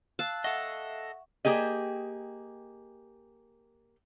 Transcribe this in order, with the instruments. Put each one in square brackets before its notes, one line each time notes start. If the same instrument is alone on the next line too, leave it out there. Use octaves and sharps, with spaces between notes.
[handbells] F5 E6 F#6 [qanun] A5
[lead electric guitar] A4 D#5 [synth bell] E5 F#5 C#6
[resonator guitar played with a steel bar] A#3 G4 G#4 D#5